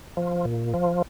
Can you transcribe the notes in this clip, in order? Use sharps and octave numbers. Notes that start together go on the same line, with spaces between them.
F3
A#2
F3